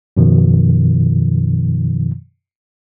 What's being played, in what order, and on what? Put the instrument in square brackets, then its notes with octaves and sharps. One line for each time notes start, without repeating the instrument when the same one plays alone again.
[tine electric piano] F#2 B2 D#3 F3